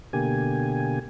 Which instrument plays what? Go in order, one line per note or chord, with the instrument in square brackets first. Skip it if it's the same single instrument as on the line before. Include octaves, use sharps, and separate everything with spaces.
[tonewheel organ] B2 D3 A#3 G4 G#5